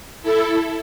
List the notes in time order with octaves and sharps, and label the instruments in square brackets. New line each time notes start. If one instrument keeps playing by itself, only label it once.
[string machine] E4 A4